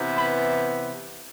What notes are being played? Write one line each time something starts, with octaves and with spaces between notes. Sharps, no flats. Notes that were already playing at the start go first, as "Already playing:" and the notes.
Already playing: C3 E3 B3 E4
B5